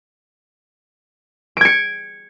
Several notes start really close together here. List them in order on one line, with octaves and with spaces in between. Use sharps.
D7 G#6 C#7